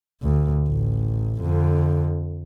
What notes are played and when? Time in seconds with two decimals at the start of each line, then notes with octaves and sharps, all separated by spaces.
0.22 D2
0.68 A1
1.39 F2 D3